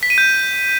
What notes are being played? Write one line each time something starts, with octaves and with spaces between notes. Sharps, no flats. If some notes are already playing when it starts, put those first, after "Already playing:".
B6
D#7
G6